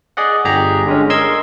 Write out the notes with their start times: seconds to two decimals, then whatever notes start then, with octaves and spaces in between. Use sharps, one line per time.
0.17 G#4 D5 D#5 F#5
0.45 G1 G4 G#4 A#5
0.86 D3 G#3 C#4
1.10 A#4 D#5 C6 E6 G#6